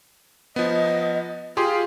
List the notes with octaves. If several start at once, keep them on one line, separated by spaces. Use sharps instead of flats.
F3 B3 D#5
F4 G4 G#4 C6